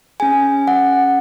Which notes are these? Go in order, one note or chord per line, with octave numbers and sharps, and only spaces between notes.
C#4 G#4 G#5
F#5